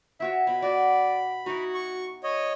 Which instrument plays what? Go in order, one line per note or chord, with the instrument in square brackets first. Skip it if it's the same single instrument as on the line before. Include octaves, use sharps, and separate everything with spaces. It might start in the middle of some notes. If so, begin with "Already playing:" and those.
[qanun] E4 F#4 C#5 [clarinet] E5
[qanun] B2 [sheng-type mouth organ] B5
[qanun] F#4 [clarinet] D5
[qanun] D#4 E4 [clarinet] F#4
[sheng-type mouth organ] C#6
C#5 D#5